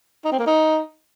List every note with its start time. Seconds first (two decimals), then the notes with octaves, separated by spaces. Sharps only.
0.25 D#4
0.32 C4
0.39 A#3
0.46 D#4